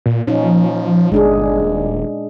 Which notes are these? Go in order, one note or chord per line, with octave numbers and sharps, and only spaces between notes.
A#2
A#2 F3 C#4 D#4
G1 G#3 D4 G#4
D#1